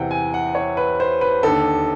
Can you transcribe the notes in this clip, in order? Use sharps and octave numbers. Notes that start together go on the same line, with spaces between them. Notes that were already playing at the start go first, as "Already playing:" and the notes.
Already playing: E2 C3 E3 F#5 G5
G#5
F#5
C#5
B4
C5
B4
D#2 D3 A4